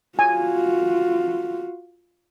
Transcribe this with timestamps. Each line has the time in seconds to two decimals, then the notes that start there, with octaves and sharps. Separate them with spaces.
0.19 F4 F#4 G#5